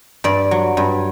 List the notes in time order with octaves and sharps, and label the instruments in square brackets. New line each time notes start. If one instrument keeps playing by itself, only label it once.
[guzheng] G2 D5
F#3
G2